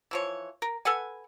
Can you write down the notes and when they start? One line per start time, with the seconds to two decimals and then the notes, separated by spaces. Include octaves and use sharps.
0.11 E3 F3 C#5
0.62 A#4
0.85 A4 B4 F#5 G#5